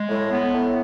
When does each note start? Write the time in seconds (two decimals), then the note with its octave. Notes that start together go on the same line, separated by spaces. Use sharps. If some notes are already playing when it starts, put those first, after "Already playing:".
Already playing: G#3
0.08 A2
0.30 B3
0.53 A2